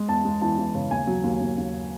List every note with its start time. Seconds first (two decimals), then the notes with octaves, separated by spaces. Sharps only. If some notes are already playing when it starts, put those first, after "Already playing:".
Already playing: G#3
0.08 E2 A5
0.25 G#3
0.41 E3 A5
0.58 E3
0.75 C#3
0.91 D#2 G#5
1.07 F#3
1.24 D#2
1.41 D#2
1.57 D#2